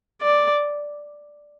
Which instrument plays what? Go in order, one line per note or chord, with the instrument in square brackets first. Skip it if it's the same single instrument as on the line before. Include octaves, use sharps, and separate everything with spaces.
[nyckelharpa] D5